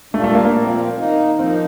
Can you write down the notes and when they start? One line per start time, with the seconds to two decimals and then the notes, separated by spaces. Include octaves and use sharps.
0.13 A#2 G3 A3 D4 F4
0.24 A3
0.35 A#3
0.45 A#3
0.55 A#2 F3 C4
0.97 D#3 A#3 D#4
1.39 F3 A#3 C4 D#4